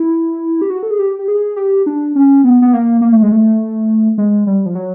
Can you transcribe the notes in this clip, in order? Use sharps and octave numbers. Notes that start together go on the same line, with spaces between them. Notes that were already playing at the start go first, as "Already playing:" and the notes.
Already playing: E4
G4
F#4
A4
G#4
G4
G4
G#4
G4
D4
C#4
B3
B3
A#3
A#3
A3
G#3
A3
G#3
G3
F3
F#3